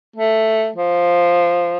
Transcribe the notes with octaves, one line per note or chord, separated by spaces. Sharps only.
A3
F3